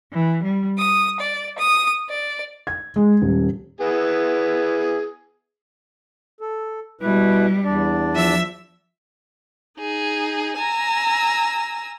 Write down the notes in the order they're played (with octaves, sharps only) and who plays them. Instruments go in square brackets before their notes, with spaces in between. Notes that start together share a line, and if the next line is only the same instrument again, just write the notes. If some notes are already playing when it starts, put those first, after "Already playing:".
[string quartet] E3
G3
D#6
D5
D#6
D5
[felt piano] G#6
G#3
D#1
[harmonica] B3 E4 G#4
[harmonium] A4
[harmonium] B2 E4 B4 [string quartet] G3
[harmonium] E2 D4 D5
[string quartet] F3 E5 E6
D#4 G#4
G#5 A#5 E6